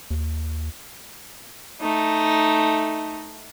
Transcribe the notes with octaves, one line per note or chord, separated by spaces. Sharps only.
D#2
A3 D#4